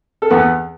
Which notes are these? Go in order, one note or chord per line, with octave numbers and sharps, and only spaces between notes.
A4
E2 B3 B4